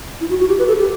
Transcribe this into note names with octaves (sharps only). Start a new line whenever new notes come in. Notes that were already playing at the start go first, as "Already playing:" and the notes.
E4
F#4
F#4
G4
B4
A4
G4